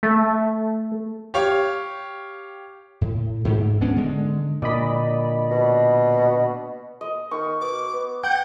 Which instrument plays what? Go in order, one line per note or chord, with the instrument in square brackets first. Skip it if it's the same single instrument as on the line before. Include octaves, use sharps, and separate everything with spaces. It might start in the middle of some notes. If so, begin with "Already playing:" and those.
[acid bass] A3
[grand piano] G4 C#5 F5
[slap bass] A2
G#2
D2 B3 C#4 D4
D3 G#3
[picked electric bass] A#2 D3 [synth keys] D5 D#5 B5
[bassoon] B2
[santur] D#5
[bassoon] D#3 [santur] C#6
[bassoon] B2 [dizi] D6
[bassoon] B3
[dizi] F#5 [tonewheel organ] G5 G6